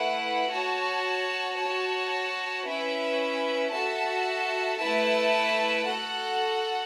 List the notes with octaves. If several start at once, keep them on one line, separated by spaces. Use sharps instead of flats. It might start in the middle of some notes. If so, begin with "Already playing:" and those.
Already playing: A3 E4 B4 F#5
F#4 C#5 A5
F#4 C#5 A5
C#4 E4 B4 E5
F#4 A4 E5 A5
A3 E4 B4 E5 A5
F#4 A4 F#5